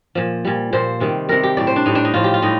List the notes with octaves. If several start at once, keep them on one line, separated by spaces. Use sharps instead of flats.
A#2 F3
A#2 G3
A#2 F3 C5
C3 D#3 G3
C3 G3 A#4
G4
A2 G3 D5
C5
D4
A2 G3 D#4
D4
D#4
A2 F3 F4
G4
F4
A2 G3 D#4